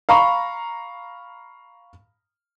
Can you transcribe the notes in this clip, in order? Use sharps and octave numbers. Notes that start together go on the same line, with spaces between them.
F5 A#5 B5 C#6